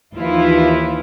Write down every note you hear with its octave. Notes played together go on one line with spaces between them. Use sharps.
D#2 E3 F3 E4 F4